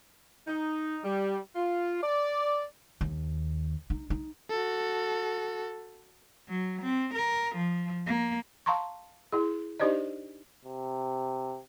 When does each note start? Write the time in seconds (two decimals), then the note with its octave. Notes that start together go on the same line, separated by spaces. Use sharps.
0.48 D#4
1.04 G3
1.56 F4
2.03 D5
3.01 D#2
3.90 D#4
4.10 D#4
4.50 F#4 A4
6.49 F#3
6.83 C4
7.15 A#4
7.56 F3
8.07 A#3
8.66 F5 A5 A#5 C6 C#6
9.32 E4 G#4
9.80 D4 D#4 G4 C5 D5 D#5
10.65 C3